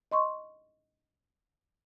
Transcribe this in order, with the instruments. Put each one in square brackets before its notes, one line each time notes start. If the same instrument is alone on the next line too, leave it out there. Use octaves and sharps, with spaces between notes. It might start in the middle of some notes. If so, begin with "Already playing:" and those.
[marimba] D#5 C6 C#6